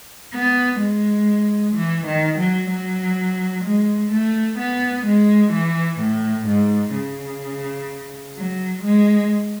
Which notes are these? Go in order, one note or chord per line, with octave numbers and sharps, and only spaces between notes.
B3
G#3
E3
D#3
F#3
F#3
G#3
A3
B3
G#3
E3
A2
G#2
C#3
F#3
G#3